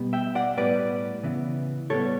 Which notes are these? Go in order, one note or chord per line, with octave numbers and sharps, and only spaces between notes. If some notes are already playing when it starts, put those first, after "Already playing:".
Already playing: B2 G3 B3
E5 G5
D5 F#5
A2 G3 B3 B4 D5
C#3 E3 B3
A2 G3 B3 A4 C#5